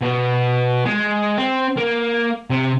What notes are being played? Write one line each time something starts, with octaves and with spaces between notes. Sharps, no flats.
B2
G#3
C4
A#3
C3